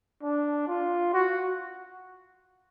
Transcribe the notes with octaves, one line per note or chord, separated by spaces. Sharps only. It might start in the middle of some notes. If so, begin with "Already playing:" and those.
D4
F4
F#4